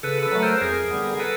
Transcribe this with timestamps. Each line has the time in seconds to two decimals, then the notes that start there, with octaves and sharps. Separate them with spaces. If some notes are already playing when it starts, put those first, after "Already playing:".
0.03 C#3 A4 B4
0.23 A4 B4
0.32 F#3 A3
0.43 A#4 C5
0.61 F2 G#4 A#4
0.91 D3 G3 B3
1.19 A4 B4